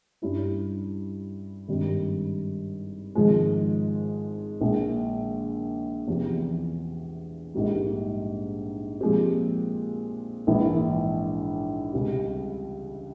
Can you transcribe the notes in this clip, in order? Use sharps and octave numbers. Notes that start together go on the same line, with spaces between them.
G2 G3 C#4 E4
G#1 G2 G3
G#1 G#2 F3 G#3
A#1 A#2 G#3
E2 C3 F3
A#1 G#2 G3 A#3
A#2 F3 G#3 C4 G4
A#1 G#2 E3 A#3 E4
C#2 C3 G3